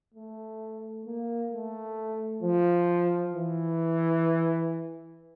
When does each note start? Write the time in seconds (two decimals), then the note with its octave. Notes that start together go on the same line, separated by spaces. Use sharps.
0.15 A3
1.06 A#3
1.52 A3
2.42 F3
3.34 E3